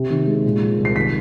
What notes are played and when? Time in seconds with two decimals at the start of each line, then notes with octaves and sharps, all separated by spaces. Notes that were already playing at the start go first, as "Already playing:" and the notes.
Already playing: C3
0.10 D#3
0.27 G#3
0.44 A#2
0.62 F3
0.78 C2
0.85 C7
0.96 D#3 B6